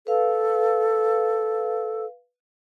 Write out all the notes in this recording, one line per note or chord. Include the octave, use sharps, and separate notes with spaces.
A4 B4 F5